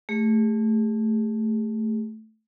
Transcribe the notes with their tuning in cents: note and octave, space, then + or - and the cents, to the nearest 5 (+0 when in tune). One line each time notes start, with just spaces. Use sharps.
A3 +0 G#4 -45